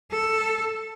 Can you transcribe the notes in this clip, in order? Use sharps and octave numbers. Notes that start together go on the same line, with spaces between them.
A4